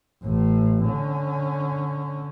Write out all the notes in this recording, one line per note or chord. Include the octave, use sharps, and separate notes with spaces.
A1 A2
D3 C#4